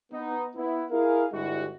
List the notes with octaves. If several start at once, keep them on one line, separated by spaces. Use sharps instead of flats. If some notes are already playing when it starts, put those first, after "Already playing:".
B3 D#4
B3 E4
E4 G#4 A#4 F5
G1 G3 G#3 B3 E4 F#4